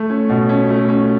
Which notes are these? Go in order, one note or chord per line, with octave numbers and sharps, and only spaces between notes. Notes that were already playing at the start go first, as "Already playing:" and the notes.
Already playing: A3
C#4
B2
C#4
A3
C#4